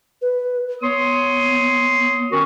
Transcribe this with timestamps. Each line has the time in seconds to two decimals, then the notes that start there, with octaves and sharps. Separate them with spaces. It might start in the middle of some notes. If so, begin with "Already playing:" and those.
0.22 B4
0.82 B3 C#5 C6 D#6
2.31 D#3 C#4 F#4 A#4